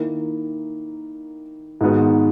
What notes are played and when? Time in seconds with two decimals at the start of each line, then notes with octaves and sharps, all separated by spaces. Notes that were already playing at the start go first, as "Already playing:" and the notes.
Already playing: D#3 A#3 E4
1.81 G#2 D#3 G#3 B3 F#4